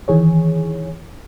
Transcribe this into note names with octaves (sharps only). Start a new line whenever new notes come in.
D#3 E3 G#4 C#5